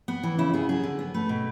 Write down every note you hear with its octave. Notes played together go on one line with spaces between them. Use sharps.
B3
E3
C#3 E4
B3 G#4
F#3 G#4
D3
B3
A3 B4
B2